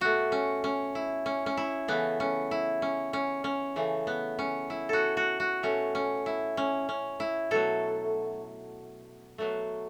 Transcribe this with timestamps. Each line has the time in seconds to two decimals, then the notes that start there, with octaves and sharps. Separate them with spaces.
0.01 B2 A3 F#4
0.32 C#4
0.64 C#4
0.95 E4
1.26 C#4
1.46 C#4
1.57 E4
1.88 C#3 E3 A3 B3
2.20 C#4
2.51 E4
2.82 C#4
3.13 C#4
3.44 C#4
3.76 C#3 E3 A3
4.07 B3
4.39 C#4
4.70 E4
4.89 F#4 A4
5.17 F#4
5.40 F#4
5.63 B2 A3 C#4
5.95 C#4
6.26 E4
6.57 C#4
6.89 C#4
7.20 E4
7.51 B2 F#3 A3 A4
9.38 B2 F#3 A3